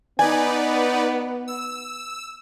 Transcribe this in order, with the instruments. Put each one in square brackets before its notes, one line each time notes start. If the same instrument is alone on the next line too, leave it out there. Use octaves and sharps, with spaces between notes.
[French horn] B3 [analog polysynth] D#4 B4 D5 [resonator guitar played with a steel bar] G#5
[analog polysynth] E6